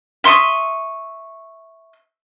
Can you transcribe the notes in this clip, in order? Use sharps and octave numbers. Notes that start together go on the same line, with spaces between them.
E5 C6 C#6 D#6